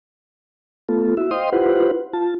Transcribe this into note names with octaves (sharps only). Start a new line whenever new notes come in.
A3 B3 F4 A4
E4 F#4 E5
C5 D#5 F5 G5 C6 D#6
E4 F4 G4 B4 C5 F#5
F4 A5